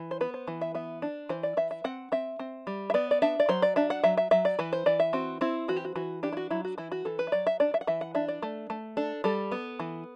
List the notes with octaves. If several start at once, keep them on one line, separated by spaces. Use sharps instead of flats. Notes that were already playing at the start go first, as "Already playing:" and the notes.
Already playing: E3
C5
B3 B4
C5
E3
E5
B3 E5
D4
E3 C5
D5
E3 E5
E5
C4 F#5
C4 E5
C4
G3
E5
B3 D5
D5
D4 E5
D5
F#3 C5
D5
D4 E5
F#5
F#3 E5
E5
F#3 E5
D5
E3 B4
C5
E3 D5
E5
C4 F#4
C4 E4
E3 F#4
G4
F#4
E3 F#4
D4 G4
E4
F#4
F#3 E4
F#4
E3 E4
F#4
E3 A4
B4
E5
F#3 D5
E5
D4 D5
E5
F#5
E3 E5
F#5
D4 E5
D5
A3
A3
D4 A4
G3 A4
B3
E3